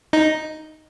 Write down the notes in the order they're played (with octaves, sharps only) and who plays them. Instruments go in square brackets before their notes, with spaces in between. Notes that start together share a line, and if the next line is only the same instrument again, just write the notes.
[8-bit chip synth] D#4